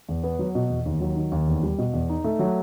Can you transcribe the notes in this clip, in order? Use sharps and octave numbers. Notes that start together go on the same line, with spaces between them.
E2
B3
F#3
B2
E2
D#2
F#3
D#3
D#2
E2
G3
B2
E2
D#4
A3
F#3